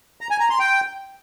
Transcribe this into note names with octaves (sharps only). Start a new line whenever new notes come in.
A#5
G#5
A#5
C6
G5